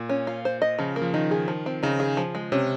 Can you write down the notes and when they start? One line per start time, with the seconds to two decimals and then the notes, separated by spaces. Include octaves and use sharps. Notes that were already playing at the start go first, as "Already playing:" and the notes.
Already playing: A#2
0.09 C#4
0.27 F4
0.45 C5
0.62 D#5
0.79 C#3 F3
0.96 A#3
1.02 F3
1.14 D#3 D#4
1.31 G#4
1.48 F3
1.66 C4
1.83 C#3 D#4
2.00 G#4
2.17 F3
2.35 G#3
2.52 C3 C#4